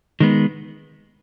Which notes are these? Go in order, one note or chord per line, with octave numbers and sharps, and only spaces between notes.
D#3 G#3 B3